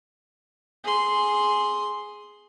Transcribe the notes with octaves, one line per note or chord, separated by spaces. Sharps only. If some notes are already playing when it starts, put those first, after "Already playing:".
G#4 C6